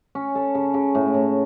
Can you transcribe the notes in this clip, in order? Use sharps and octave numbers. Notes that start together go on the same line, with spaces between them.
C#4
A4
C#3
C#3
A2
A2